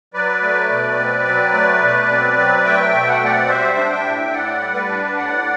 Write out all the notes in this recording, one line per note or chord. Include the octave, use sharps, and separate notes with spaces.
F#3 B4 D5
A3
B2
C4
F#3
A3
B2
C4
F#3
A3 E5 G5
B2
F#5
G5
C4 D5 F#5
G3 C5 E5
D4
E5 G5
A2
A2 D5 F#5
G3
B4 D5
D4
A2 D5 F#5